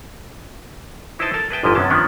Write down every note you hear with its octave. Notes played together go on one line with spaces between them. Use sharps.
D#4 E4 B4 C5 D#5 A5
A4 A#4 A5
G#4 B4 E5 G5 A5
G1 G#2 F3 E4 D#5
F#2 C3 B3 C#4 D4 A5
D#3 F3 B3 C#4 D4